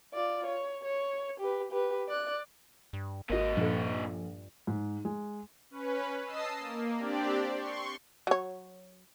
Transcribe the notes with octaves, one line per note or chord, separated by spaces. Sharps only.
F4 D5
C#5
C#5
G4 B4
G4 B4
D5 F#6
G2
G#1 A#2 F#4 A#4 D#5
A#1 G2 A4
G#2
G#3
C#4 B4
D#5 A5 D#6 E6 C7
A#3
C4 D4 G4 D5
C6 C#6
F#3 C#5